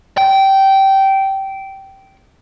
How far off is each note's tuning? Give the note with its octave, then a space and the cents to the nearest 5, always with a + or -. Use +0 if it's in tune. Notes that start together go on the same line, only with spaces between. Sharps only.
G5 -15